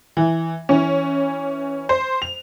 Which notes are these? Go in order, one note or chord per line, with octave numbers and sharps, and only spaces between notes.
E3
E3 C#4
C5
F7